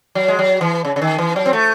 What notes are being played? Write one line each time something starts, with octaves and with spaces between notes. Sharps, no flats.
F#3
G#3
F#3
E3
C#3
C#3
D#3
E3
F#3
C4
A3